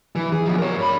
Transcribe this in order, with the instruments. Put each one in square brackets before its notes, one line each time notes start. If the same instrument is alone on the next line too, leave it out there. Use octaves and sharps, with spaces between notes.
[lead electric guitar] E3
G#4
B2 F3
A#4 C#5
G2 B5